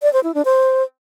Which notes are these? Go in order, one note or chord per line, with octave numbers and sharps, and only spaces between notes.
D5
C5
E4
D4
C5